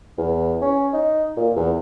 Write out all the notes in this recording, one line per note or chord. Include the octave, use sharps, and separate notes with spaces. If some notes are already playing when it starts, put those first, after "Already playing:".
E2
C#4
D#4
A#2
E2